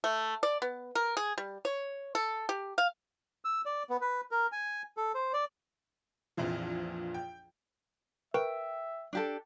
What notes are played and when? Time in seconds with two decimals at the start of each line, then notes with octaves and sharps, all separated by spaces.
0.04 A3
0.43 D5
0.62 B3
0.95 A#4
1.17 G#4
1.38 G3
1.65 C#5
2.15 A4
2.49 G4
2.78 F5
3.45 E6
3.65 D5
3.90 B3
4.01 B4
4.31 A#4
4.52 G#5
4.97 A4
5.15 C5
5.33 D5
6.37 A#1 F2 A#2 E3 F3
7.14 G5
8.34 A#4 B4 E5 G5 C#6
9.13 D4 G4 A4